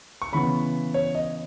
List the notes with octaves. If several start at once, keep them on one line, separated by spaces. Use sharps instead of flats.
C#6
C#3 E3 B3 B5
C#5
D#5